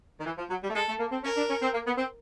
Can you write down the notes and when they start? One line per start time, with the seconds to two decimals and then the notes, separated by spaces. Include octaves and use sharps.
0.21 D#3
0.25 E3
0.38 F3
0.50 F#3
0.63 G3
0.70 A3
0.75 G#3 A4
0.88 A3
1.00 A#3
1.12 C4
1.24 C#4 A#4
1.37 D4
1.49 C#4
1.62 C4
1.74 A#3
1.86 B3
1.98 C4